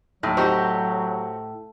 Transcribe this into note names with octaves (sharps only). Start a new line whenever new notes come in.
D#2 A2 F#3
C4 D#4 F#4 G4